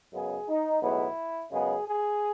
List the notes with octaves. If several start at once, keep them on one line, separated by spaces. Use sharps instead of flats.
F#2 C#3 G#3 B3 G#4
D#4
B1 A2 G#3 B3 E4
F#2 C#3 G#3 B3 G#4
G#4